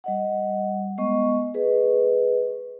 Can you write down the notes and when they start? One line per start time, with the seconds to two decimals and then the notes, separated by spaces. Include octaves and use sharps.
0.04 G3 D#5 F#5
0.98 G#3 B3 D#5 C#6
1.54 G#4 B4 D#5